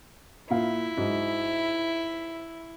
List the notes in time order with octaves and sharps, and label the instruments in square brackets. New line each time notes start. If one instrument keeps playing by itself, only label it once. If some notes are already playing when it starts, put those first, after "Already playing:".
[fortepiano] A#2 F5 [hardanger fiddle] E4
[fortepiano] G#2 F#3